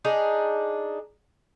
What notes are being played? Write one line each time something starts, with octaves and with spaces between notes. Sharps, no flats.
D4 D#4 G#4